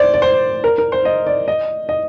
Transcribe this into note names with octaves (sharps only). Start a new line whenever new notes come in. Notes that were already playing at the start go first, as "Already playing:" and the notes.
Already playing: C5 D5
D5
C5
A#4
A#4
C5
D#5
D5
D#5
D#5